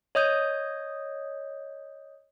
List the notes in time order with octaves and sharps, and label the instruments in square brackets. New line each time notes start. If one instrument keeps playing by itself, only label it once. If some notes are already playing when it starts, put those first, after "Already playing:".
[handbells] C#5 D#5 D#6 G6